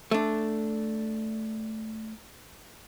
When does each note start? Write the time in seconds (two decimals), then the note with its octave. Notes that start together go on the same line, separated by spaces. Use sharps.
0.11 A3 D4